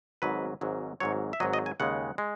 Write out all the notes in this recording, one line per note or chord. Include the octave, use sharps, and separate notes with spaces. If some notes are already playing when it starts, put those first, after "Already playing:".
G#1 G#2 F#3 B4
G#1 G#2 F#3
G#1 G#2 F#3 C#5
E5
G#1 G#2 F#3 D#5
D#5
G#5
D#2 C#3 G#3 F#5
G#3